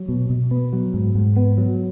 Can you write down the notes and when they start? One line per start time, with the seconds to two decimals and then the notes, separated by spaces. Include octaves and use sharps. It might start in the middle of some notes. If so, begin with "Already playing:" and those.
Already playing: F#3
0.09 B2
0.30 B2
0.51 B3
0.73 F#3
0.94 G#2
1.15 G#2
1.36 B3
1.58 F#3